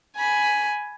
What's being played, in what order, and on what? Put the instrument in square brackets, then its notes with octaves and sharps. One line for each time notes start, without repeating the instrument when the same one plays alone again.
[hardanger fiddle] G#5 B5